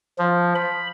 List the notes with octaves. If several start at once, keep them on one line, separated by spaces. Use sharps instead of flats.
F3
B5